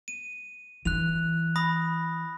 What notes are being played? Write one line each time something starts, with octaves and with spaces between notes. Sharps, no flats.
D#7
E3 F#6 F7
B5 D#6 A#6